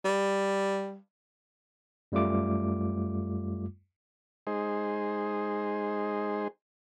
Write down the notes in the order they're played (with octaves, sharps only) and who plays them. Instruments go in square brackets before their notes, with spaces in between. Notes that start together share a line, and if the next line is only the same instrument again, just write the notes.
[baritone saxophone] G3
[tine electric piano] F#2 G3 A3 F4 D6
[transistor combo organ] G#3 D#4 G#4 C5